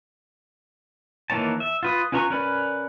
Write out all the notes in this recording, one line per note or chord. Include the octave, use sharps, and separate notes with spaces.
D#3 E3 A#3 C#5 A5
E5
F4 B4 D#6
C#4 F4 B4 A#5 C#6
C#4 A#4 B4 D5 B5